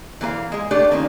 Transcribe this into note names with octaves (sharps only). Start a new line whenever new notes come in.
E3 A#3 B4 F5
G#3 G#4
A3 D4 G4 D5
D#3 F3 A#3 C#4